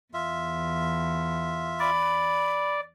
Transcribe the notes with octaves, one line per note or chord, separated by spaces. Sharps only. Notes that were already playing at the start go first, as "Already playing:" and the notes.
E2 F4 E5
D5 B5